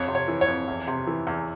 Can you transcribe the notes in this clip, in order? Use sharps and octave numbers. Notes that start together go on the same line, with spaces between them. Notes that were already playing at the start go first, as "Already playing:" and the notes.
Already playing: F2 C#5
C3
C#5
E3
C#5
F2
E2
C3
E3
E2